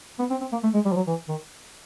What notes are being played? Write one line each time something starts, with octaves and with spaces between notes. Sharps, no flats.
B3
C4
C4
A#3
A3
G#3
G3
F3
F#3
E3
D#3